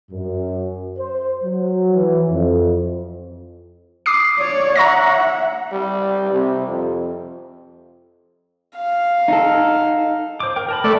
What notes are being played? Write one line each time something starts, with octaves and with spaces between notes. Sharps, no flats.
F#2
C5
F#3
E3
F2
D6 D#6 C7
C#5 D5
E5 F#5 A#5 C#6 A#6
G3
C3
F2
F5
D#4 A4
C5 D6
A#4 G5
A#4 A5 B5
A3 D5